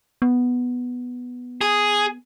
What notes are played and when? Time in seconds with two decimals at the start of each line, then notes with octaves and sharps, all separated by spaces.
0.22 B3
1.61 G#4